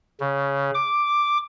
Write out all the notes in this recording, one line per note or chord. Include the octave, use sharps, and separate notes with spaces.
C#3
D6